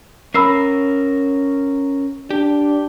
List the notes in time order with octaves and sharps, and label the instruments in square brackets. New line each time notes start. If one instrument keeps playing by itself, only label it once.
[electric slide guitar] C#4 A#4 [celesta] B5 E6 C7
[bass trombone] D4 [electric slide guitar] G4